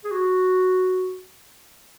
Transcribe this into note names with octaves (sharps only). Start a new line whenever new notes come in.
G#4
F#4